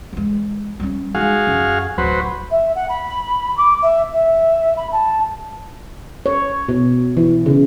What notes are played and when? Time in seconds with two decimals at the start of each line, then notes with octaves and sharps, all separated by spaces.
0.13 E3 G#3
0.80 G3 C#4
1.14 G#3 D#4 F#4 G#4 F5
1.47 F#2
1.98 D1 F#3 B4 C5
2.51 E5
2.75 F#5
2.89 B5
3.57 D6
3.82 E5
4.13 E5
4.77 B5
4.92 A5
6.26 C#5
6.69 B2
7.17 E3
7.46 C#3